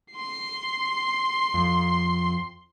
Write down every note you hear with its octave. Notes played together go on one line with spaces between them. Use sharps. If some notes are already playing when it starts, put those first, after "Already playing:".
C6 C7
F2